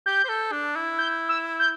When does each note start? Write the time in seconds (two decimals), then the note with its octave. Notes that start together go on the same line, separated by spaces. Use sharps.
0.06 G4 G6
0.25 C5
0.29 A4
0.52 D4
0.76 E4
0.98 G6
1.29 E6
1.59 G6